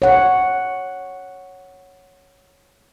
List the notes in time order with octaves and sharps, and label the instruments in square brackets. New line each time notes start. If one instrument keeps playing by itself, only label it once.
[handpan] C#5 F#5